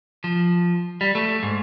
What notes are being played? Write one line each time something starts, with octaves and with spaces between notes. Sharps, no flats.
F3
G3
A3
G#2